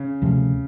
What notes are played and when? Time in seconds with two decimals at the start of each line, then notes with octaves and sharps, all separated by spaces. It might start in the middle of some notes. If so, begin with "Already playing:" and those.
Already playing: C#3
0.22 D2 C3 F3 A3